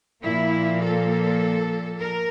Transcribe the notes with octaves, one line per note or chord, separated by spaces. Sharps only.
A#2 F3 A#3 E4
A4
A#4